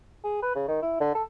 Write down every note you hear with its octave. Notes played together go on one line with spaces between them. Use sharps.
G#4
B4
C#3
D#3
E4
D3
A4